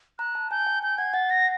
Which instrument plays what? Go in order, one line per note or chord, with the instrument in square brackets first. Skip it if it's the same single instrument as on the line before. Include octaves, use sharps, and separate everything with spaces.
[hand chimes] A#5 [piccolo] F#6
[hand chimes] A5
[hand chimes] G#5 [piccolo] G6
[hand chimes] G5
[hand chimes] G#5 [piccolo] G6
[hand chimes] F#5 [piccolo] G#6
[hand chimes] F#5 [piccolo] A6
[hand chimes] F#5 [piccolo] A#6